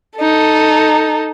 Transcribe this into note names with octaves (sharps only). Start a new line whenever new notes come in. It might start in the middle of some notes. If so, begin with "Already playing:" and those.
D#4 A4